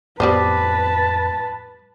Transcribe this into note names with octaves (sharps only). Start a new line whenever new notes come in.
F2 A2 G3 B3 B4 C5 A5